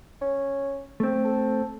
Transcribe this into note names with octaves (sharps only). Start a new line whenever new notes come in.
C#4
A3 C4
A4